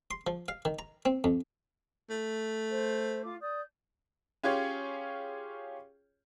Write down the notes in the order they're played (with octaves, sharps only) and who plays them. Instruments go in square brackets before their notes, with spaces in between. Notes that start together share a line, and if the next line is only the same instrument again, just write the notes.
[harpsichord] C6
F3
F5
D#3
A#5
C4
F2
[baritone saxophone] A3
[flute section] C5
F4 D6
D5 D#6 G6
[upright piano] C#4 F4 G4 G#4 C#5